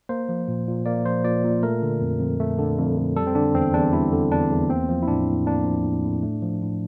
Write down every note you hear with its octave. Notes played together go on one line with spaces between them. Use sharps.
A#3 C5
F3
A#2
A#2
A#3 D5
F3 C5
A#2 D5
A#2
A3 A#4
D3
F2
F2
A3
D3
F2
F2
G3 A4
C4
D3 D4
E2 C4
E2 D4
G3 E4
D3
E2 D4
E2
A#3 C4
F3
E4
A2 D4
A2
A#3 D4
F3
A2
A2
A3
F3
A2